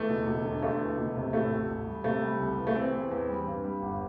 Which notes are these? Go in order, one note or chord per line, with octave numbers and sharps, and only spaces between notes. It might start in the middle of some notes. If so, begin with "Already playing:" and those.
Already playing: E2 A3
E1
E1
D3
D2 A3
E3
E1
C3
A2 A3
A1
A1
G3
C3 A3
G3
C2
E3
A3
E3 C4
E2
E2
G3
G2
G3
G1